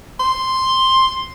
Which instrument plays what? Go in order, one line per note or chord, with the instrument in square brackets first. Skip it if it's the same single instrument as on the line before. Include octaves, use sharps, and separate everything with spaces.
[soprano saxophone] C6